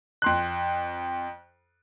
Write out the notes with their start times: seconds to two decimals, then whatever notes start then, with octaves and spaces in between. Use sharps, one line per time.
0.22 F2 C6 F#6